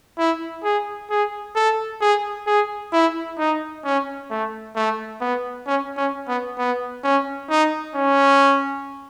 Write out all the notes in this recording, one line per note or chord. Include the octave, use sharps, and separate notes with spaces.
E4
G#4
G#4
A4
G#4
G#4
E4
D#4
C#4
A3
A3
B3
C#4
C#4
B3
B3
C#4
D#4
C#4